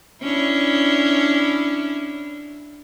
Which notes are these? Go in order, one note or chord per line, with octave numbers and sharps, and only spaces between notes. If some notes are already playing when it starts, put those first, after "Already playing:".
C#4 D4 E4